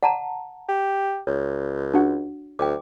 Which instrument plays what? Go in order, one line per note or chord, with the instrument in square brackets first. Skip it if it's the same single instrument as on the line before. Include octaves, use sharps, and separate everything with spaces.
[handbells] D5 [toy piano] F#5 A5 A#5
[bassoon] G4
[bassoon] C#2 [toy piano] C#5
[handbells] D4 F#4 F#5
[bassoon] D2 [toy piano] G5 D6